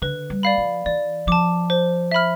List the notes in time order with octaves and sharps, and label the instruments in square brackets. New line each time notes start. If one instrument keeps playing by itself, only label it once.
[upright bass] D3 [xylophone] B4
[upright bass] G3
[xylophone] D5 F5 B5
[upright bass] F3
[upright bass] E3 [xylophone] D5
[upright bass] F3 [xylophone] A5 D6
[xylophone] C5
E5 B5 F6